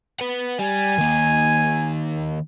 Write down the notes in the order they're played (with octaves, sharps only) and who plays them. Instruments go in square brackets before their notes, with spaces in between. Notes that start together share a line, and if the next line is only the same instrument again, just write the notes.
[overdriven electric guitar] B4 F#5
[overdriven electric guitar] G3 [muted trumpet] G#5
[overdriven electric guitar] D#3 A#3